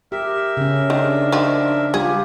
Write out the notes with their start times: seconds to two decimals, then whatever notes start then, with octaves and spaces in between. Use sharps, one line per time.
0.12 G4 A#4 E5
0.57 C#3 C#4
0.90 D#3 D4
1.32 D#3 F3
1.94 G3 F4 G4 G#4